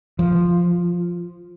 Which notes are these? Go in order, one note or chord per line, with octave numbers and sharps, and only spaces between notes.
F3